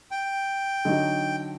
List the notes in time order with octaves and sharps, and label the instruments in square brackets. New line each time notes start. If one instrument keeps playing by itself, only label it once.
[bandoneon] G5
[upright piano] D3 F#3 D#4